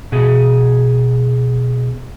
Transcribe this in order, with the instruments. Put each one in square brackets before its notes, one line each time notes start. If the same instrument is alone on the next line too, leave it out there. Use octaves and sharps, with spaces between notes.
[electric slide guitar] B2 G#4